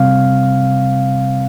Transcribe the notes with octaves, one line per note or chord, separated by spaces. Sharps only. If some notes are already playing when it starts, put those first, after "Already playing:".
Already playing: C3 G3 C4 F5